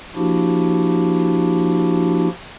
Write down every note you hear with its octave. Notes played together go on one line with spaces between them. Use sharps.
F3 A#3 D4 E4 F#4 G4